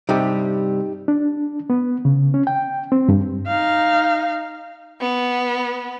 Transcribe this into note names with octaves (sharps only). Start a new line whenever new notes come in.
G2 C3 G3 D#4 G4
D4
B3
C#3
C#4
G5
C4
G2
D#4 F5
B3